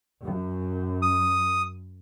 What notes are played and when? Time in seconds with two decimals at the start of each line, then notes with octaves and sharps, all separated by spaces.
0.22 F#2
1.02 D#6